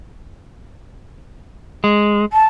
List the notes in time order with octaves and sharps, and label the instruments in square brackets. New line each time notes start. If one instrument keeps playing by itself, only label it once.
[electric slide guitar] G#3
[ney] A5